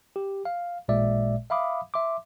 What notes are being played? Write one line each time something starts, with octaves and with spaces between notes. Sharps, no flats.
G4
F5
A1 A#2 G#3 D5 E5
E5 F5 B5 D6 D#6
E5 C6 D6